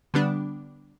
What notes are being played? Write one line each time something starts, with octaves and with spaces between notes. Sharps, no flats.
D3 G3 B3 D4